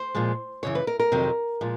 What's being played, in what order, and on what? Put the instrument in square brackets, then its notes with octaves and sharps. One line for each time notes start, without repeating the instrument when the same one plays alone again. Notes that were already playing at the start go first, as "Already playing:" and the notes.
Already playing: [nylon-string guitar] C5
A#2 F3 G#3
F#2 C#3 E3 C#5
B4
A#4
A#4
F2 C3 D#3 F#3
A#2 F3 G#3